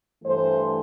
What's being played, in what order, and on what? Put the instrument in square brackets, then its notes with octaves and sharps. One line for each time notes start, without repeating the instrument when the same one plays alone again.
[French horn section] G2 E3 A3 C5